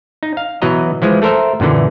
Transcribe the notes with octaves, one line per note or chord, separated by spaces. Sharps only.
D#4
F5
B2 E3 F#3 D#5 A#5
E3 F3 G#3
A3 A4 A#4 C5 E5
F#2 A#2 D3 E3